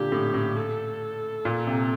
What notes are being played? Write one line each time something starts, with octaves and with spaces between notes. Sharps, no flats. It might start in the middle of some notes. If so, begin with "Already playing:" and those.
Already playing: A#2 D3 G4
A2
A2
A4
A#2
C3